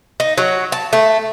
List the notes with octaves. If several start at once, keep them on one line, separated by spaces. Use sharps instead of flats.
D#4
F#3
A5
A3